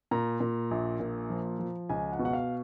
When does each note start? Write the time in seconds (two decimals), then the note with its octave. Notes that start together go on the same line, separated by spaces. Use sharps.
0.11 A#2 A#5
0.40 A#2
0.71 A#1
1.00 A#2
1.30 F3
1.59 F3
1.89 C#2 G#5
2.12 F#5
2.19 B2
2.25 F#5
2.33 F5